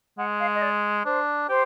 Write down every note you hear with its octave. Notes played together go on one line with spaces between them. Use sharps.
G#3 F#5
F5
D#5
D5
D4 C5
G4 C5